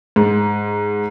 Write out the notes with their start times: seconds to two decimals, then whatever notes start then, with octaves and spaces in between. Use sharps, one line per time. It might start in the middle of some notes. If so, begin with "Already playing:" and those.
0.16 G#2